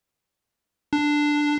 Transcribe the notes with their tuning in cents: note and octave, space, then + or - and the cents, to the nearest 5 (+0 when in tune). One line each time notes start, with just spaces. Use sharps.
D4 +5